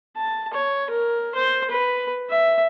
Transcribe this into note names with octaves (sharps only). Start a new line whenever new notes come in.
A5
C#5
A#4
C5
B4
E5